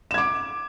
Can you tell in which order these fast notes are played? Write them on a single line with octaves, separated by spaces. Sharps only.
E7 G#6 D6